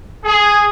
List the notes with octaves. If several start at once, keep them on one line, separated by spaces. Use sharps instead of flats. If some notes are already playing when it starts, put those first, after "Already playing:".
G#4